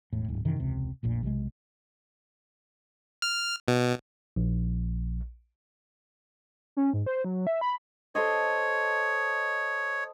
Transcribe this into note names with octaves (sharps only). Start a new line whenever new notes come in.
E1 A2
D1 G#2
F#2 C3 D#3 E3
E1 C#2 C3
F1 A#1 A#2
B1 C3 G3 G#3
F6
B2
A#1
C#4
G#2
C5
F#3
E5
B5
A4 C5 C#5 D#5